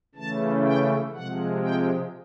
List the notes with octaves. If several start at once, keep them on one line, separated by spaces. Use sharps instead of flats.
C#3 E3 A3 A5
G5
C3 F3 G#3 F#5
G5